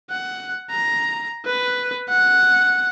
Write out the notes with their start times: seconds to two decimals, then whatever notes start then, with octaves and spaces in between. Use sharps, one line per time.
0.11 F#5
0.70 A#5
1.45 B4
2.09 F#5